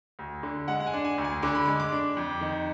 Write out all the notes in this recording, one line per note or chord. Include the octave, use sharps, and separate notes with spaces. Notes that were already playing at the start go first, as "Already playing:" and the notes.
D2
D3
G#3 F#5
F#5
G#5
D4
G#5
D2
G#5
D3 D6
B5
G#3 D6
D6
D4
F2
D#3